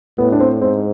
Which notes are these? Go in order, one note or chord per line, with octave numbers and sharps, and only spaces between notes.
A2 B3
D4
C4
G#2 C4